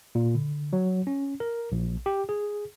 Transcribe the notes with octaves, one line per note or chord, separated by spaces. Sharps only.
A#2
D3
F#3
C#4
A#4
A#1
G4
G#4